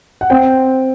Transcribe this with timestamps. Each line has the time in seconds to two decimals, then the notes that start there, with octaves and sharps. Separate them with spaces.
0.21 F#5
0.30 C4 G5